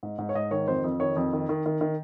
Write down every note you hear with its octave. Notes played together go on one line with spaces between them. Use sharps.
G#2
G#2
C#5
G#2 D#5
D#3 C#5
F2 C5
F2
D#3 C#5
F2
D#3
D#3
D#3
D#3